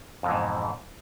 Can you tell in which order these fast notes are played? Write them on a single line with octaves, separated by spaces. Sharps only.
F2 B2 E3 G#2